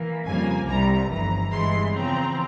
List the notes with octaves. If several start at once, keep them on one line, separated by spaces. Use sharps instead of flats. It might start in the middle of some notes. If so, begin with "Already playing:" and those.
Already playing: E3 A#3
F2 C#3 G3 A#3 G#5
C2 C3 G3 A#5
G1 F2 E3 A#5
G1 G2 E3 G#3 C6
E2 C#3 F3 C4 A#5